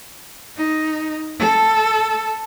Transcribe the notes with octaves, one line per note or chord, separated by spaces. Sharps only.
D#4
A4